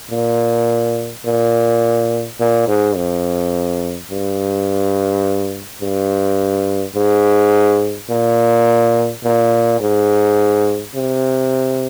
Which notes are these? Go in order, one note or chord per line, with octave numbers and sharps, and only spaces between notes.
A#2
A#2
A#2
G#2
F2
G2
G2
G#2
A#2
A#2
G#2
C3